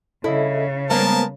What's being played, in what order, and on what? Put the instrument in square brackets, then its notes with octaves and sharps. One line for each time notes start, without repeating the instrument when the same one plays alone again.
[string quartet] C#3 [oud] E4 [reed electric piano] A4 D#5 E5
[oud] G#3 A#3 B3 [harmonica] A#4 A5 [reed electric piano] C5